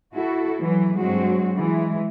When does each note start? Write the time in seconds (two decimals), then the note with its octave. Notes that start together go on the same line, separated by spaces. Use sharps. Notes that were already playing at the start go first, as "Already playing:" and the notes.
0.14 E4 F#4 A4
0.62 E3 F#3
0.97 G2 F#3 G#3 C4 F#4
1.58 E3 G#3